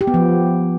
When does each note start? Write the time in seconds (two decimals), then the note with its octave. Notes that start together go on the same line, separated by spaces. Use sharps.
0.01 G4
0.07 B3
0.14 F3